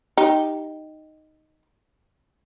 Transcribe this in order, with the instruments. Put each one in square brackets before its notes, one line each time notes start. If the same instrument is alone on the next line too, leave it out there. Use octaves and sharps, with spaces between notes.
[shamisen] D#4 G4